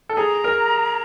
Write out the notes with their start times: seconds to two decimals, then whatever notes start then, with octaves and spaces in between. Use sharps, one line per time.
0.09 A4
0.17 G#4 A#5
0.44 A#4